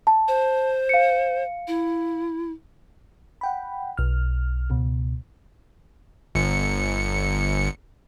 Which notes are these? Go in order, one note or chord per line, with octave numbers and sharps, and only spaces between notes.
A5
C5
F5 C#7
E4
F#5 G5 B5
B1 F6
C#2 B2
G1 C#7